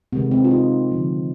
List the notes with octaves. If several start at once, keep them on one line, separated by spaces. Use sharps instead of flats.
C3 D#3 G#3 B3
C4
F4
D#4
D3 F3 G#3